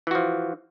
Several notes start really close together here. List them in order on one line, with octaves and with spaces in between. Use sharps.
E3 F#4 F3